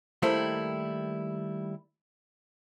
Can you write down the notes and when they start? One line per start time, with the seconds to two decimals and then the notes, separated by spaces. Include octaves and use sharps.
0.22 D#3 G3 A3 A#3 E4 C5